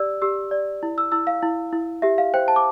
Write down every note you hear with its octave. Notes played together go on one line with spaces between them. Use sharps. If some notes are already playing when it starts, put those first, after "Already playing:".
Already playing: G4 D5 E6
G4 E6
D5
E4
E6
E4 E6
F5
E4
E4
G4 E5
F5
C5 G5
A5
D6